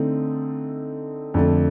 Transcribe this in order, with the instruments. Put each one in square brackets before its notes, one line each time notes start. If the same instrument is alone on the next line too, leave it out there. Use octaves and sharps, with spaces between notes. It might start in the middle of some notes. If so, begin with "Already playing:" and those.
Already playing: [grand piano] D3 A3 C4 D#4
F2 D3 A3